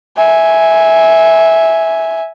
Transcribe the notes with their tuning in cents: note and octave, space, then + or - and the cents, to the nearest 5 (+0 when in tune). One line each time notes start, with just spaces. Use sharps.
E5 -10 G#5 +0